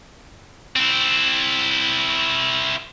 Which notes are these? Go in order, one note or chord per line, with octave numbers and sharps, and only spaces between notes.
C4 E4